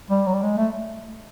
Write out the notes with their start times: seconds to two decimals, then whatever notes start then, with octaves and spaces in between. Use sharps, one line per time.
0.10 G3
0.26 F#3
0.33 G3
0.42 G#3
0.57 A3